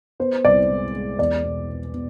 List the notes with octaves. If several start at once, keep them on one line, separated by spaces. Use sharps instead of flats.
B3 C5
C2 D5
G#3
G#3
E2 D5
B2
B3
B2